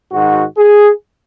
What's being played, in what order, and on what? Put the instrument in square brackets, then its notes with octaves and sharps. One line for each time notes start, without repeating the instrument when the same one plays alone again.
[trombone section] G#2 D#3 F#4
G#4